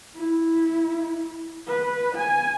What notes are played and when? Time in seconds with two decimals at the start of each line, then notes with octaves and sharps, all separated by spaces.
0.16 E4
1.67 B4
2.15 G#5